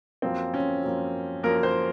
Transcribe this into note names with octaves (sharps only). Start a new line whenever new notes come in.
F#2 F3 A#3 C4
C#4
F#2 F3 A#3
F#2 F3 A#3 A#4
C5